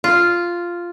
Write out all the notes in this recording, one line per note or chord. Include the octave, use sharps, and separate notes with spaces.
F4